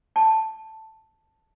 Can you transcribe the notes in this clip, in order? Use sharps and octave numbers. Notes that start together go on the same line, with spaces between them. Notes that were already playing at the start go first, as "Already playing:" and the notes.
A5